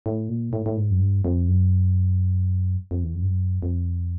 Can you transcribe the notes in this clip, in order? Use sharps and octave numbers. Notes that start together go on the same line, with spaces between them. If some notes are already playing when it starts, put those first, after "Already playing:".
A2
A#2
A2
A2
G#2
F#2
G2
F2
F#2
F2
E2
F2
G2
F#2
F2